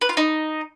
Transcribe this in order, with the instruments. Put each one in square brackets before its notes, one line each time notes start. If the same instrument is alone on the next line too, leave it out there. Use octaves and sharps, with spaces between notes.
[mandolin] B4
F4
D#4